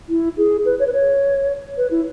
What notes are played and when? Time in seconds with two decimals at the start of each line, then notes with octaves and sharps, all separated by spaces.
0.09 E4
0.37 G#4
0.65 B4
0.79 C#5
0.87 B4
0.93 C#5
1.77 B4
1.91 E4